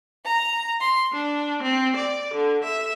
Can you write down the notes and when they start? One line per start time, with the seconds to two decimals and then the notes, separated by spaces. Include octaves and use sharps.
0.25 A#5
0.81 C6
1.11 D4
1.63 C4
1.95 D5
2.34 D3
2.64 E5